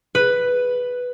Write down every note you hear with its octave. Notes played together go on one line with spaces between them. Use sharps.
B4